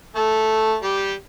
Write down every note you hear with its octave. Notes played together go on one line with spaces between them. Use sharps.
A3 A4
G3 G4